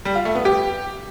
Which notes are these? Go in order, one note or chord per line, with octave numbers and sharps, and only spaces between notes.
G3
F4
A3
B3
G4